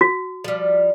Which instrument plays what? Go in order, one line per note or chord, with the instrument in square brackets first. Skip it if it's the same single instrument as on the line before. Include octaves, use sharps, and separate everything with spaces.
[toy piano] F#4
[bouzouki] F3 G3